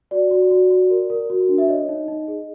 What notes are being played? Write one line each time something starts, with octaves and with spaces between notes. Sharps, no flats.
F#4 D5
F#4
F#4
F#4
A#4
A#4
F#4
D4
E5
C#5 D#5
D#4
D#4
G#4